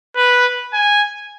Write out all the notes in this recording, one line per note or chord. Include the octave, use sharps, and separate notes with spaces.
B4
G#5